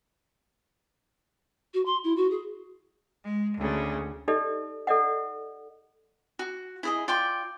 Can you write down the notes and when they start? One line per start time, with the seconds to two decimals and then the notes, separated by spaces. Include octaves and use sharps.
1.74 F#4
1.86 C6
2.04 E4
2.16 F#4
2.31 G#4
3.23 G#3
3.55 D2 C#3
4.28 D#4 G4 A4 D5 D#5
4.87 A4 D5 D#5 F#5
6.39 F#4
6.83 E4 G#4 D#5
7.08 F4 D5 G5 C6